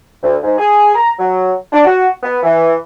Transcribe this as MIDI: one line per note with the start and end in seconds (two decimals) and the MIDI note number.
0.23 0.37 38
0.43 0.55 44
0.58 0.90 68
0.95 1.10 82
1.19 1.52 54
1.73 1.83 62
1.85 2.08 66
2.23 2.38 59
2.43 2.74 52